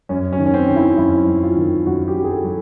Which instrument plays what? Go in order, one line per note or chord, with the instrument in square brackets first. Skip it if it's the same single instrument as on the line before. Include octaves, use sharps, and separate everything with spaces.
[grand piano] F#2 C#4
C#4
D#3
C#4
C4
D#3
E4
F#2 E4
F#2
F4
D#3
F#2 F#4
G4
F#3
G#4
A4
F#3